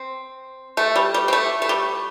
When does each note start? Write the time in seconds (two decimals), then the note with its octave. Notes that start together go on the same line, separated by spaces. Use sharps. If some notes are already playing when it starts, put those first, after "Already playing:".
Already playing: C4
0.77 A3
0.96 G3
1.14 G3
1.28 C4
1.33 A3
1.62 A3
1.69 G3